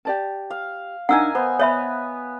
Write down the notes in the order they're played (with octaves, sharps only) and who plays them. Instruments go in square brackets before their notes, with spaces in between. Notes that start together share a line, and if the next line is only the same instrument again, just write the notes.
[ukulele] G4 D5 A5
[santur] F5
[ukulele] D4 D#4 [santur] A#4 D#5 G#5 [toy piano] F#5 E6
[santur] B3 [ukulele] C5
[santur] B3 [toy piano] C#5 E5 B5